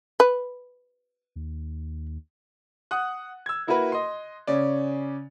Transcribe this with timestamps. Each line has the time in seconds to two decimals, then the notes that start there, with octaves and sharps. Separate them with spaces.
0.20 B4
1.36 D#2
2.91 F#5 D#6 F#6
3.46 E6 G#6
3.67 A#3 E4 F#4 A#4 B4
3.92 D#5 C6
4.47 C#3 C#4 D5